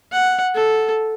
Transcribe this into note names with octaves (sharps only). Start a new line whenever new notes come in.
F#5
A4